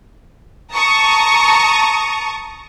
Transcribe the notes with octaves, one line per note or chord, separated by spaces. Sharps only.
A5 A#5 C#6 D#6